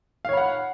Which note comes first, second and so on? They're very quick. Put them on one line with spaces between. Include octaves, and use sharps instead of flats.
F5 C#5 B5 F#5